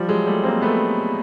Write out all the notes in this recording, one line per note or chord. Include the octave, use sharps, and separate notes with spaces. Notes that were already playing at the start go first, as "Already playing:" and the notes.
Already playing: F3 G3
F#3 G#3
G3 A3
A#3 C4
A3 B3